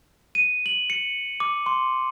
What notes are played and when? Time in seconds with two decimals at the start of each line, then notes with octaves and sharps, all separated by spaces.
0.35 D#7
0.66 F#7
0.90 C#7
1.40 D6
1.66 C6